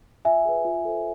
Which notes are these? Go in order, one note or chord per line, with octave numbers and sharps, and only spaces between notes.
F4 E5 G#5
G#4 B4
F4
A4 C5